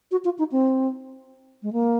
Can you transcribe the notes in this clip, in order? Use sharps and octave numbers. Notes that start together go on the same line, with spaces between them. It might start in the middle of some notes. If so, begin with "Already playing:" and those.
F#4
F4
D#4
C4
G#3
A#3